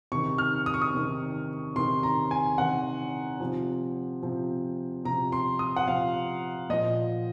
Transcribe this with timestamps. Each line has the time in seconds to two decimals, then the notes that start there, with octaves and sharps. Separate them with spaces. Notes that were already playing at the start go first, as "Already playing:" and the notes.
0.12 C3 D#3 C#6
0.38 F6
0.66 D#6
0.74 C#6
0.82 D#6
0.94 C3 D#3
1.76 C3 D#3 C6
2.03 A#5
2.31 G#5
2.58 C3 D#3 F#5
3.40 C3 F3
4.23 C3 F3
5.04 C3 F3 A#5
5.32 C6
5.59 D#6
5.76 F#5
5.87 C3 F3 F5
6.70 A#2 F3 D#5